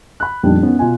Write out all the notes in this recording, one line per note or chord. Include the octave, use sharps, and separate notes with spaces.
B5 F#6
F2 A#2 D#3 G3 B3 D4
D#3 B3 C#4
B2 F4 G#5